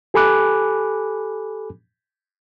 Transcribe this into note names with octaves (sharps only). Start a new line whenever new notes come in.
G4 A4 G#5 B5 D6 F#6